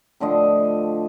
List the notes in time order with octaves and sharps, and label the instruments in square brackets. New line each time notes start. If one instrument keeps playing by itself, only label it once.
[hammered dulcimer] A2 D3 F3 D#5